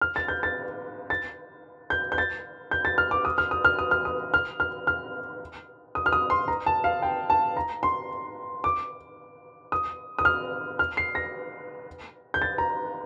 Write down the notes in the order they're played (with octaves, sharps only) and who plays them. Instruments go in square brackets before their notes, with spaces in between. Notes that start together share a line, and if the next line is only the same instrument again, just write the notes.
[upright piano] F6
A6
G6
A6
A6
G6
G6
A6
G6
A6
F6
D6
D#6
F6
D#6
F6
D#6
F6
D#6
F6
F6
F6
D#6
F6
D#6
C6
A#5
A5
F5
G5
A5
A#5
C6
D6
D#6
D#6
F6
F6
C7
A#6
G6
A6
A#5